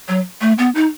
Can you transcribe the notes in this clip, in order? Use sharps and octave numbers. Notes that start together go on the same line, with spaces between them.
F#3
A3
B3
D#4